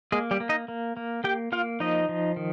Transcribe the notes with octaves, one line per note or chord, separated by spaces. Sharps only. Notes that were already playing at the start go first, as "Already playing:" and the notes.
G#3 A#3 G#4
G3 G4
A#3
D#4 D#5
A#3
A#3
A#3 G4 G5
A#3 F4 F5
F3 D#4 D#5
F3
D#3